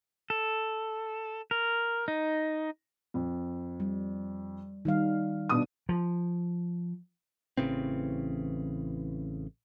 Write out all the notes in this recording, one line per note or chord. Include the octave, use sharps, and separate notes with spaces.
A4
A#4
D#4
F2
G3
D#3 G3 F5
B2 D4 D#6
F3
A1 C#3 E3 C4